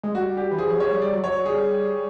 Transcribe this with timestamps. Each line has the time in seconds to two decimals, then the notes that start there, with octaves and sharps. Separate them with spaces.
0.03 G#3
0.14 G3 F#4
0.37 G4
0.51 E3
0.58 F3 G#4
0.70 F#3
0.80 F3 C#5
0.91 G3
1.02 G3 D5
1.13 F#3
1.23 F#3 C#5
1.35 F#3
1.45 G3 G#4